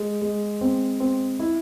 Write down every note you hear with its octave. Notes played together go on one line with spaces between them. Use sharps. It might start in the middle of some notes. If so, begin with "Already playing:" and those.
Already playing: G#3
G#3
C4
C4
E4